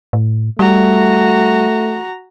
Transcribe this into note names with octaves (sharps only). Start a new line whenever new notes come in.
A2
G3 A3 F#4 A#5